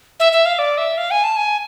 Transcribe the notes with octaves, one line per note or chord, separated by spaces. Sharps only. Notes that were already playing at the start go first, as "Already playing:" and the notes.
E5
E5
F5
D5
E5
F5
G#5
A5
G#5